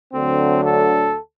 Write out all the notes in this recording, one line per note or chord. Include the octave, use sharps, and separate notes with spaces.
D2 D3 F#3 C4
A4